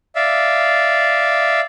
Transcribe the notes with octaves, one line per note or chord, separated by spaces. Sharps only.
D5 E5 F5